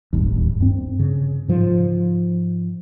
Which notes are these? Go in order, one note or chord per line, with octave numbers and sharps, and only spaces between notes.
D1 G1 D#2
G2 C4
C#3
G#2 F3